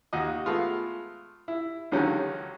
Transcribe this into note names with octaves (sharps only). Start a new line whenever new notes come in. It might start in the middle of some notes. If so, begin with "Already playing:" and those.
D#2 F#4 D#5
G#3 A3 B3 F4
E4
C#2 D3 D#3 F#3 C#4 G5